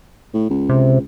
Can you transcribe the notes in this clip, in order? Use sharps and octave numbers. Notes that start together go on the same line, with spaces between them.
A2
C#2
C3